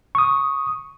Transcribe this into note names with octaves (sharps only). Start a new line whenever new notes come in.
C#6 D#6